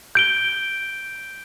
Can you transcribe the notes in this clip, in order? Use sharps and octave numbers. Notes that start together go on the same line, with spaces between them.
G6 D7 G7